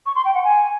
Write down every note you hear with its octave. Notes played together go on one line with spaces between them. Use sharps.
C#6
C6
G5
F#5
G#5